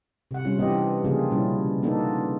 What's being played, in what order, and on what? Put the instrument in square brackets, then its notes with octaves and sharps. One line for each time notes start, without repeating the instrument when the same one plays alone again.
[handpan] C3 F#5
G3 C#4 F4
E3 B3 C4 D4 G4 D#5
C#3 F3 A#3 D4 F4 G#4
B2 G3 C#4 E4
A#3 B3 D4 D#4 F4 A4